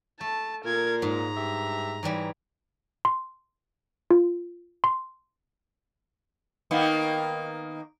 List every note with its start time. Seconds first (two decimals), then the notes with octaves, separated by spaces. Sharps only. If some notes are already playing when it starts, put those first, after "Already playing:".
0.21 A3 A5
0.64 A#2 A#4 G#6
1.02 G#2 A#5
1.36 G2 G4 E5
2.03 G#2 E3 G3
3.05 C6
4.11 F4
4.84 C6
6.71 D#3 A#3 B3